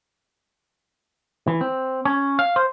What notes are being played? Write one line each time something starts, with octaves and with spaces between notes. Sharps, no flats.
E3
C4
C#4
F5
C5